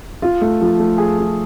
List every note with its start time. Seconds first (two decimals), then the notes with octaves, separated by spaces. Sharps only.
0.22 F4
0.41 A3
0.61 F3
0.79 A3
0.98 G#4
1.18 F4